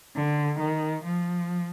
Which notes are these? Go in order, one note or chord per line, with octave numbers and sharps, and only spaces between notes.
D3
D#3
F3